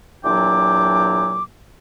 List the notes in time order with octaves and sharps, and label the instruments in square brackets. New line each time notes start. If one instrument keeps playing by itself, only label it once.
[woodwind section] E2 A#2 F#3 D4 G5 D6